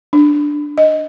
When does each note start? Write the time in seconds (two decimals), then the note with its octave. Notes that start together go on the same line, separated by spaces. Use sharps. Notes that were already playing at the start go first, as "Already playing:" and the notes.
0.13 D4
0.78 D#5